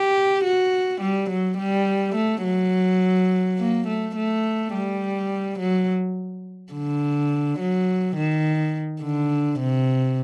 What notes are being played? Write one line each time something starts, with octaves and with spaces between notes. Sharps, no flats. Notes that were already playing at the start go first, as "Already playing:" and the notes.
Already playing: G4
F#4
G3
F#3
G3
A3
F#3
A#3
A3
A3
G3
F#3
D3
F#3
D#3
D3
C3